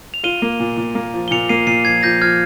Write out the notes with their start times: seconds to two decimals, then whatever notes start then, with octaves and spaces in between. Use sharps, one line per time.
0.14 F7
0.24 F4 D#7 G7
0.42 A#3
0.60 A#2
0.77 A#2
0.95 A#3
1.14 F3
1.28 G7
1.31 A#2 C#7 F7
1.49 A#3 C7 D#7
1.67 A#2 C7 D#7
1.85 F3 G#6 C7
2.03 F3 G6 A#6
2.21 F3 F6 G#6